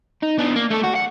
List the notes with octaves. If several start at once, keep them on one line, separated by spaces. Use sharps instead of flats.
D#4
B3 D4
A#3
A3 A4
F#4
F#5